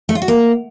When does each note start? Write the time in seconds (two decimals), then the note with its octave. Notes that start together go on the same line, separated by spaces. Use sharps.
0.09 A3
0.15 F4
0.22 F#4
0.28 A#3